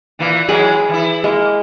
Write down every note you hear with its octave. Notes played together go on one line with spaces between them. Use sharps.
A#2 E3 A#3
E3 F#3 G#3 G#4 B5
E3 E4
G#3 A#3